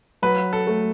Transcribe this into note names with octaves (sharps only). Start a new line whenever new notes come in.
F#3 B4
A4
A3